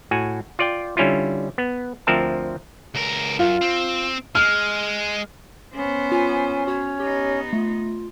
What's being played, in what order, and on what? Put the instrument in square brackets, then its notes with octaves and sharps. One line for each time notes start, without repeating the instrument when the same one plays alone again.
[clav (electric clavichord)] A2 F#4 G#5
F4 D5 G5
D3 G3 C#4 E4 F4
B3
D2 F3 C4 A#4 E5 A5
[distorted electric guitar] C#2 A#4
[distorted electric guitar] F#2 [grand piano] F4
[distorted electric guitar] C4
[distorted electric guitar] G#3 [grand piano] F6
[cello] B3 C5 [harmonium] C#4
[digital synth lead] F4 [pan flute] G#5
[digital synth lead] F#4 [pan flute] C#5
[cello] B3 D#4 [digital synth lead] G4
[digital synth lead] A3 [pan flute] F4